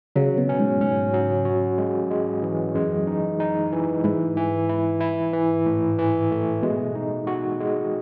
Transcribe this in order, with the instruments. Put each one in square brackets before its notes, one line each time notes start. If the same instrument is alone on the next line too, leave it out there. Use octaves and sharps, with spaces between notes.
[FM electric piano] C#3 [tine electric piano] F#3
[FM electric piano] B2
[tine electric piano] C#4
[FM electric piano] G#2
[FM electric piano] G#2 [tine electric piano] C#4
[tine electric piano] F#3
F#4
G#3
G#3
E3
[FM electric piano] F#2 [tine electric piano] G#3
[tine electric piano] D#4
D#4
E3
[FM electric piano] G#2 [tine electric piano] E4
[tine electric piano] E3
E4
E4
E3
A2
E3
A3
[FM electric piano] B2 [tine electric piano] G#3
[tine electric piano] D#4
F#4
G#3